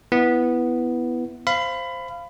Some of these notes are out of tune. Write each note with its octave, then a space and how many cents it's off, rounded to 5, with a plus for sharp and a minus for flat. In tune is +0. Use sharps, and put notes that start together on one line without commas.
B3 +0 E4 +0
C5 +0 F5 -15 B5 +20